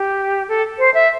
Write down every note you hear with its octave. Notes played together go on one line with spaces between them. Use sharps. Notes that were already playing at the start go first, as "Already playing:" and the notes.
Already playing: G4
A4
C5
E5